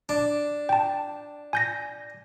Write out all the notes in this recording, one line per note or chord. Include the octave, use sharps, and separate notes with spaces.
D4
G5 A5
G#5 G6 A#6